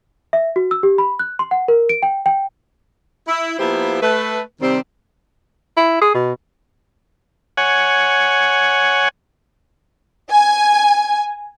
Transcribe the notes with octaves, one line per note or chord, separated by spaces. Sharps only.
E5
F#4
E6
G4
B5
F#6
C6
F#5
A#4
D7
G5
G5
E4
F3 A#3 B3 E4 G4 C5
A3 B4
C3 D#3 G3 C4
E4
G#4
B2
C#5 F#5 G#5
G#5